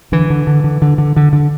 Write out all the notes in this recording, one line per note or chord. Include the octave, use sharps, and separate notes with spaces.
D3 E3
D3
D3
D3
D3
D3
D3
D3